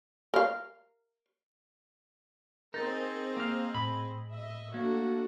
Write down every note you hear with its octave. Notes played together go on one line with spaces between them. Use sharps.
A#4 F5
C4 D#4 G#4 A#4 D#5 A6
A#3 F5
A2 B5
D#5 E5
A3 A#3 D4 F#4